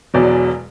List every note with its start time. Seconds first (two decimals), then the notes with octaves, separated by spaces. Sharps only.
0.14 E1 E2 B2 F#3 D5